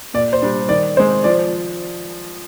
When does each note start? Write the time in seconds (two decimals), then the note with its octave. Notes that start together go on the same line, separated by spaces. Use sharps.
0.14 A#2 D5
0.33 C5
0.42 G3 D4
0.69 D#3 D5
0.97 G#3 C4 C5
1.24 F3 D5